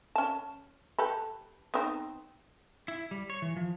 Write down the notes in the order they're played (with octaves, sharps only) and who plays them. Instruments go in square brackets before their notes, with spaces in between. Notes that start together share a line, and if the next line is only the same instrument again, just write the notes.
[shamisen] C#4 A5
G4 A4 B4
B3 C4 D#4
[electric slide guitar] E4
G3
C#5
E3
F3